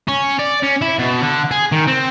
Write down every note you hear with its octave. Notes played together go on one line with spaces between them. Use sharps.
C#4
D5
C#4
E4
B2
D3
G#4
D#3
C4